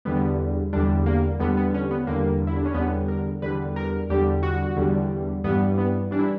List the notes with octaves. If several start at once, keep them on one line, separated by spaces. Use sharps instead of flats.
E2 D3 G3 B3
E2 D3 G3 D4
A#3
E2 D3 G3 B3
B3
C#4
B3
E2 D3 G3 A#3
E4
D4
C#4
E2 D3 G3 B3
A#4
E2 D3 G3 B4
A#4
E2 D3 G3 G4
F#4
E2 D3 G3
G2 E3 G3 B3
B3
E3 G3 D4
E4